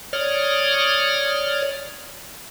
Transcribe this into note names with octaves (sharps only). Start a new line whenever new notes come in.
C#5 D5 D#6 F6